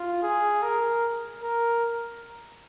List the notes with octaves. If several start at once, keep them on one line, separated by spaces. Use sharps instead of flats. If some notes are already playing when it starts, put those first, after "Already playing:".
Already playing: F4
G#4
A#4
A#4